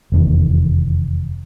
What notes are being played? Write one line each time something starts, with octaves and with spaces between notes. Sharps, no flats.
F1 E2 D#3